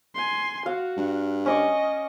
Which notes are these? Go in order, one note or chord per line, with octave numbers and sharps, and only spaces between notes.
G#5 C6
F#4 F5
G2
C#4 D#5 C#6 D6